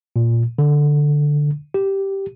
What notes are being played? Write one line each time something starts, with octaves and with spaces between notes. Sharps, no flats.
A#2
D3
G4